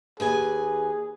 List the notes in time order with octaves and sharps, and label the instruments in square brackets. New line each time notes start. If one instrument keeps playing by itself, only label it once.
[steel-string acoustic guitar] D#2 B4 G#5 [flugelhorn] G#4